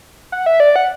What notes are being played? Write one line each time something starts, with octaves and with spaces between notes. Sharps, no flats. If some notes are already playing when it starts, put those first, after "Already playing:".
F#5
E5
D5
F#5